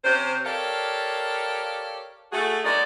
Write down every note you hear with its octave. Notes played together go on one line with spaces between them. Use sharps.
C3 C#4 C5
G4 A4 A#4 C#5 D5 F5
A3 F#4 G#4
F#3 G#3 A#3 D#4 D5